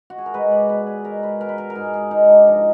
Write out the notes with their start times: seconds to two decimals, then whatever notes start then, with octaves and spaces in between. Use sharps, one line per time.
0.10 F#4
0.18 G#4
0.26 A#4
0.34 G#3 B4
0.51 D5
0.69 B2 B4
0.87 G#4
1.05 G#3 A#4
1.23 B4
1.40 B2 A#4
1.49 B4
1.58 A#4
1.70 A#4
1.75 G#2 G#4
1.94 G#4
2.11 G#3 D#4
2.24 D4 D#4
2.47 F3 D#4